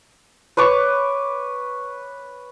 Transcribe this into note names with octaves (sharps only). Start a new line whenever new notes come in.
B4 C#5 C#6 D6